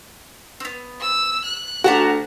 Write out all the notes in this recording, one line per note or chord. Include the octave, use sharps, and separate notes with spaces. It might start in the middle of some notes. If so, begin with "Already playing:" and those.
B3 C4
E6
F#6
D2 F#4 G4 A5 A#5